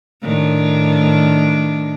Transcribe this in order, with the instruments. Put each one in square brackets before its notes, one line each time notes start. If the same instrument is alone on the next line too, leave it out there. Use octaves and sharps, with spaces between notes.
[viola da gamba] A2 D#3 D4